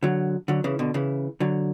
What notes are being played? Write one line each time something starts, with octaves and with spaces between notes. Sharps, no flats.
D3 F#3
D3 F#3
C#3 E3
B2 D3
C#3 E3
D3 F#3